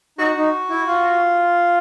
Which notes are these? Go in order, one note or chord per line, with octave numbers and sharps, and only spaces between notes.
D#4 F#4
D#4
E4
F4